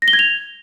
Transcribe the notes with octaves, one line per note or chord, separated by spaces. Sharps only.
A#6
G7
G#6
F7